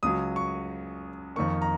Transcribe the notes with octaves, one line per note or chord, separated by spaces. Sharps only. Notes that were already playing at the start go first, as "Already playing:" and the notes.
C#2 C#3 F#3 D#6
C#6
F2 D#3 A#3 C#6
A#5